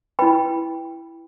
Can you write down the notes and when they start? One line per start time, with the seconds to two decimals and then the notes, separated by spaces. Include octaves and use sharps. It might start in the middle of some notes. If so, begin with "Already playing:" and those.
0.19 E4 B4 G5 B5